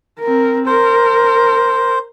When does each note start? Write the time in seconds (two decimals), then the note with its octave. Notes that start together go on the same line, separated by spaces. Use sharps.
0.20 C4 A#4
0.66 A#4 C5